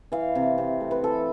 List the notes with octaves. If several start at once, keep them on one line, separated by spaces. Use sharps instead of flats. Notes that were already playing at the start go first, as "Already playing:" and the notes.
E3 F5
C3
C3
A3
B4
E3 A4